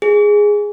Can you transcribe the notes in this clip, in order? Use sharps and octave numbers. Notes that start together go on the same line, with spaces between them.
G#4